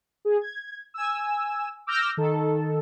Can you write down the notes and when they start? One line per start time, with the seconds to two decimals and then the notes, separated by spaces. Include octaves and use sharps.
0.25 G#4
0.41 G#6
0.94 G#5 E6
1.87 D6 E6 F6 G6 A#6
2.17 D#3 A4